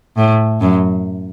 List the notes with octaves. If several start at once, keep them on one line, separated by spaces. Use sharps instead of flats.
A2
F#2